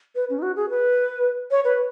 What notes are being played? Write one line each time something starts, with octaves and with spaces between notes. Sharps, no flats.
B4
C#4
D#4
F#4
G#4
B4
C#5
B4